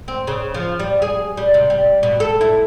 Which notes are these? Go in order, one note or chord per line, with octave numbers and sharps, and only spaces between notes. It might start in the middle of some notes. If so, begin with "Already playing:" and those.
C4
C#3
F3
G3
G#4
G3
C3
G3
B2
A4
E4